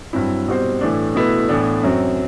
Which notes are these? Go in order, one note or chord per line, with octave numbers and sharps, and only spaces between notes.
G2 F#3 C4 E4
B2 G3 C4 F#4 C5
A2 E3 A3 D4
B2 A3 E4 B4
A2 E3 B3 D4
F#2 F#3 C4